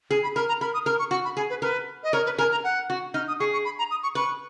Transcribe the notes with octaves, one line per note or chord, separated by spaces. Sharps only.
G#4
B5
A#4 B5
A#5
A#4 B5
D#6
A#4 F6
C#6
F#4 C#6
B5
G#4 G#5
B4
A#4 B4
D#5
A#4 C#5
B4
A#4 G#5
A#5
F#5
F#4
D#4 F6
D#6
G#4 C#6
C#6
B5
A#5
D#6
C#6
B4 C#6